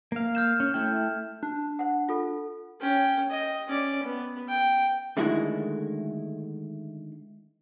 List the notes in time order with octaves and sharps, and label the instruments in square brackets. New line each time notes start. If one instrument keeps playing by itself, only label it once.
[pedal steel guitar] A#3 F5
[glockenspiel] F6 G6 E7
[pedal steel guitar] C#4
A3 E4 G5
[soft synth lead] D4
[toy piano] C5 F#5
F4 A4
[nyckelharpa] C#4 G5
D#5
C#4 D5
B3
G5
[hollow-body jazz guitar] D3 D#3 G#3 A3 E4 F#4